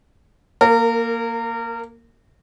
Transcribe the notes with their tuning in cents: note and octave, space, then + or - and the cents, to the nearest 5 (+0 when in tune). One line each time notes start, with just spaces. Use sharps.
A#3 +0 A#4 -30